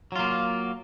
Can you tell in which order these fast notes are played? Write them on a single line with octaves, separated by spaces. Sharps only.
F#3 F4 A#3